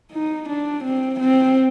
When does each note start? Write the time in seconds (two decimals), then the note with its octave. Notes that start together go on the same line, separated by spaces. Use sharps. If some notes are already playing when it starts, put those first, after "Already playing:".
0.13 D#4
0.49 D4
0.83 C4
1.20 C4